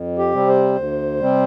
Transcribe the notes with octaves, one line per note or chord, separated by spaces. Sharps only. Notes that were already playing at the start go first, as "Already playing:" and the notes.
Already playing: F2
G4
C3 G3 C4
C5
D2
C3 G3 C4